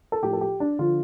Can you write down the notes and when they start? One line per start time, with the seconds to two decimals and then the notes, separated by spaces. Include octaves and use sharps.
0.12 A4
0.23 A2 F3 G4
0.33 A4
0.41 G4
0.60 D4
0.79 D3 F3 F4